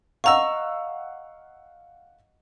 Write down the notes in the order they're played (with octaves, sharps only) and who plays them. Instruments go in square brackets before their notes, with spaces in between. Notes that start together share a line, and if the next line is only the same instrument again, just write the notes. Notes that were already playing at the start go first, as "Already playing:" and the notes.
[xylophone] D#5 A#5 C#6 [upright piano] F5 F#5 E6